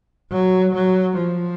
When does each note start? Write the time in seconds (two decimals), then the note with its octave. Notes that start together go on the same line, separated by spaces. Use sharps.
0.30 F#3
0.74 F#3
1.16 F3